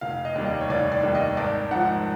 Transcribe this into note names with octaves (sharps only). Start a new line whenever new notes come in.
F1 F5
D#5
D#2 D#3 G3
D#5
C#5
F1 D5
D5
D#2 D#3 G3
D#5
G#1 D5
G#2 F3 F#5